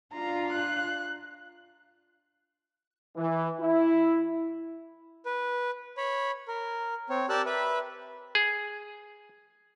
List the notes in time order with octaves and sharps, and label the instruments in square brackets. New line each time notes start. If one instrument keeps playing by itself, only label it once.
[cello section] D4 F4 F5 [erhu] A#5
[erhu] F#6
[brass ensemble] E3
E4
[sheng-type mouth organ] B4
C#5 B5
A#4
C4 C#5
G4 A#4 D5 A5 E6 F#6
B4 E5 B5
[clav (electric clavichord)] G#4